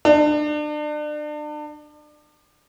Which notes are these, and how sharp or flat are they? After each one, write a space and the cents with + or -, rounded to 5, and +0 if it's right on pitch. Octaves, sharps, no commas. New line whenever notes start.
D4 +35